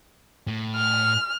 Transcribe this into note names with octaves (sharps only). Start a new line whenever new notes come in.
A2
F6